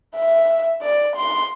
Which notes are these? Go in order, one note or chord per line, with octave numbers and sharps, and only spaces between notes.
E5
D5
C6